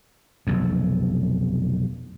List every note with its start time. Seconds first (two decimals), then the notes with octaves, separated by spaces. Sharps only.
0.47 F1 B1 F2